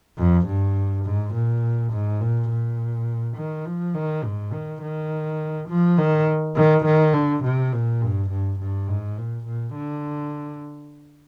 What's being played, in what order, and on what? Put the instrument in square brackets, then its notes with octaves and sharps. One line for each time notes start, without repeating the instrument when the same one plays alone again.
[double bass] F2
G2
G#2
A#2
G#2
A#2
A#2
D#3
F3
D#3
G#2
D#3
D#3
F3
D#3
D#3
D#3
D3
C3
A#2
G2
G2
G2
G#2
A#2
A#2
D3